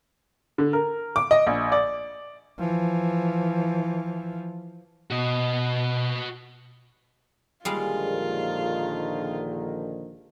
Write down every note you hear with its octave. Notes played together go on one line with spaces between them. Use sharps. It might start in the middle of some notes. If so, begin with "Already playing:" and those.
D3
A#4
D6
D#5
A#1
D5
E3 F3
B2 F#4 D#5
A#1 D3 D#3 G3 G#3 F4 F5